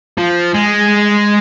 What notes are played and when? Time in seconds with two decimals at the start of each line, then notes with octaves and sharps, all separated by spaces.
0.18 F3
0.54 G#3